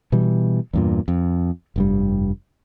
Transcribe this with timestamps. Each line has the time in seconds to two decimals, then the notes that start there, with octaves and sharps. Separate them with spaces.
0.12 B2 E3 G3
0.73 E2 G2 A#2
1.08 F2
1.76 F1 G2 G3